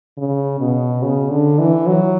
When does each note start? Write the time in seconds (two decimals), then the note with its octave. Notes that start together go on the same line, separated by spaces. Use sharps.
0.18 C#3
0.59 B2
1.02 C#3
1.31 D3
1.59 E3
1.87 F#3